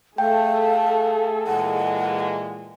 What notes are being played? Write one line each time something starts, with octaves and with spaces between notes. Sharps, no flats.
A3 G#4 A4 F5 G5
A#2 E3 G#3 F#5